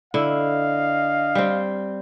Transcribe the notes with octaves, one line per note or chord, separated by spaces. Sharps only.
D3 E4 D#5 F5
G3 C4